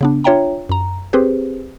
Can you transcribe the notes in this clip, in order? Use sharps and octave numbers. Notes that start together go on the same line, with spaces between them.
C#3 B3 D4
D4 F4 C#5 E5 G5 A#5
F#2 A#5
C4 G4 G#4 B4 C5